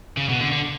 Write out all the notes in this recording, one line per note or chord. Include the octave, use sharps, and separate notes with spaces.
C#3
B2
D3
D3